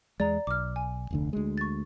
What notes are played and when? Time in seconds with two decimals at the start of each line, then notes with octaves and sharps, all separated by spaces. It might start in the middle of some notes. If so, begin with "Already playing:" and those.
0.20 E2 G#3 D5 A#5
0.47 B1 D6 F6
0.76 G#5
1.11 F1 D2 D3
1.33 D2 G#3
1.58 C#6 A6